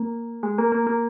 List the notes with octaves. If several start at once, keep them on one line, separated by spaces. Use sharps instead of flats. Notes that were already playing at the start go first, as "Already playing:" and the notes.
Already playing: A#3
G#3
A#3
A#3
A#3